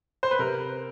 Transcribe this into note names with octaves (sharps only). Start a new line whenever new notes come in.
C5
B4
C3 A#4